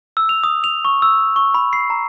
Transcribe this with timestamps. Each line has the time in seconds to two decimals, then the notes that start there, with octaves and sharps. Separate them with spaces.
0.17 E6
0.29 F7
0.44 D#6
0.64 F7
0.85 C#6
1.02 E6
1.36 C#6
1.54 B5
1.73 C7
1.90 A#5